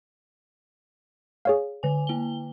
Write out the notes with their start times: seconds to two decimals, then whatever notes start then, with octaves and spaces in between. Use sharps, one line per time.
1.45 G#4 C#5 F5
1.83 D3 G#5
2.07 A#3 G7